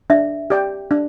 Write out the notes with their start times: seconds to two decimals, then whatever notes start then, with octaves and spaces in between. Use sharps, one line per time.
0.10 D4 E5
0.50 G4 D5 G5
0.91 D4